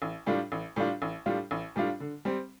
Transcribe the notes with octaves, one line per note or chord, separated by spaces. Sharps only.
A1
A2 G3 D4 F4
A1
A2 G3 D4 F4
A1
A2 G3 D4 F4
A1
A2 G3 D4 F4
D3
G3 C4